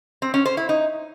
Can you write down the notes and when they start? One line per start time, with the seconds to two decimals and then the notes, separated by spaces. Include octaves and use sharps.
0.22 C4
0.34 C#4
0.45 C5
0.57 E4
0.69 D#4